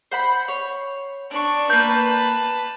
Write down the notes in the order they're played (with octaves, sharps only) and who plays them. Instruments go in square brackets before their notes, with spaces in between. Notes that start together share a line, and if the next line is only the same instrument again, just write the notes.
[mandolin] C5 F#5 B5
C#5
[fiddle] D4 C#6 [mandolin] D5
[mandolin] A#3 G6 [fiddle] B4 A5